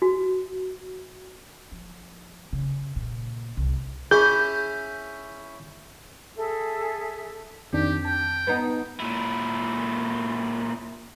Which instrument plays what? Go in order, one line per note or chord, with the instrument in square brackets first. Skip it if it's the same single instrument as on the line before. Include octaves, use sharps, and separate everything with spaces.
[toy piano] F#4
[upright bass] F3
C#3
A#2
C2
[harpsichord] C#4 E4 G#5 [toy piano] G#4 [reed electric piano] G6
[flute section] G#4 A4 E5
[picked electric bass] F2 C4 [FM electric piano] D#3 D4 [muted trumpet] G4
[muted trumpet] G5 [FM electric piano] A5
[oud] B3 D#4
[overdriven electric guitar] A#2 E4